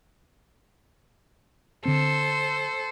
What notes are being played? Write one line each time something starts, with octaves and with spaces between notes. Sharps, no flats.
D3 C4 A4 C5